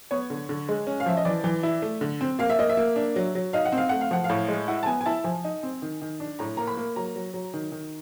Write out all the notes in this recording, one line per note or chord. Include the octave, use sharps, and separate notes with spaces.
B3 C#5
D3
D3
G#3
C#4
F5
F3 E5
D#5
E3 D5
E3
E4
A3
D3
C4
A#3 F5
E5
A#3 D#5
E5
A#3
D4
F#3
F#3
D#4 F5
F#5
C4
F5
A3 F#5
F5
F3 F#5
F5
A2
G#3
E4 F#5
A5
B3 G#5
G#5
E4 A5
F3 G#5
D#4
C4
D#3
D#3
D4
A2 A#5
A#3 A#5
B5
A#3
F#3 A#5
F#3
F#3
D#3
D#3